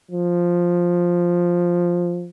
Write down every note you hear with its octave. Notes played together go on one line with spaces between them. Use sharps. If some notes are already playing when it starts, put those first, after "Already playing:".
F3